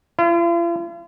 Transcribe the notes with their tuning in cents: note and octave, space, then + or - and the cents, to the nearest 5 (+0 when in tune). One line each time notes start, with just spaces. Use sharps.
F4 -45